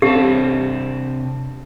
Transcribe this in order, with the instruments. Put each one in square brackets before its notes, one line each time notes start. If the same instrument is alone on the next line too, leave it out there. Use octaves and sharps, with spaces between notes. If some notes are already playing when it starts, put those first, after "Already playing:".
[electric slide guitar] C3 C4 D4 [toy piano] G4